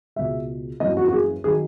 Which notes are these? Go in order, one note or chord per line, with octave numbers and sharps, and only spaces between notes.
C#2 B2 G#3 E5
F#2 E3 A#3 D#5
F#4
F#4
G#4
D#3 F#3 G#4